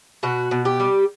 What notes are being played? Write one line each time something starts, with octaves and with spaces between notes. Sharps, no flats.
B2 F#4
B2
G4
G3